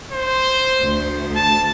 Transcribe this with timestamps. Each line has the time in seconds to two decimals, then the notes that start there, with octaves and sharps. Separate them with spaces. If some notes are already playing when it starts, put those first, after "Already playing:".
0.12 C5
0.82 D2
1.35 A5